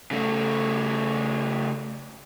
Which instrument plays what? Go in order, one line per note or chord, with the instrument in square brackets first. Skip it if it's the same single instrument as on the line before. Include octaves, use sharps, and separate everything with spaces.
[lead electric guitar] C#3 A3